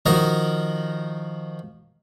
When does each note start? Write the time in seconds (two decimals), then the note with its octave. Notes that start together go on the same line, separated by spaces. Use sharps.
0.06 D#3 F3 F#4 A#4 D#5